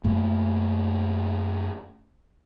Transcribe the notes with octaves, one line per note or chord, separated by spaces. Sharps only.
F#2 A3 A#3